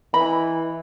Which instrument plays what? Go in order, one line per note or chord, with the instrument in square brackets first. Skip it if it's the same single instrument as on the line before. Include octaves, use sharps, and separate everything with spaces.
[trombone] E3 [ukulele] D#5 B5